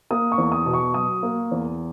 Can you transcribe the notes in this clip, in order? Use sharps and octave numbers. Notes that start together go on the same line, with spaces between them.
A#3 D#6
C#6
E2
D#6
B2
C#6
F#3 D#6
A#3
E2